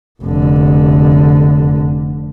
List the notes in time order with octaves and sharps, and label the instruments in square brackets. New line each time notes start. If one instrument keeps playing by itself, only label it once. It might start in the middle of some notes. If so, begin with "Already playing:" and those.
[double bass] F1 D3